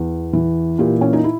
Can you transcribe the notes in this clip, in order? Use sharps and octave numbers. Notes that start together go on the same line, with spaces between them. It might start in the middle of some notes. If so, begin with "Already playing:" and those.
Already playing: E2
E3
A#2 G4
C#4
D#4
E4